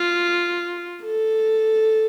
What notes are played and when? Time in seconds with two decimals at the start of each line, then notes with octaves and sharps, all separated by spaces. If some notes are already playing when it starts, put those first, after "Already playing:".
Already playing: F4
1.04 A4